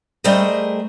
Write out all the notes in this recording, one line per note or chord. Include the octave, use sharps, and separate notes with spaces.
G3 A3 G#4 A#4 C5 D#5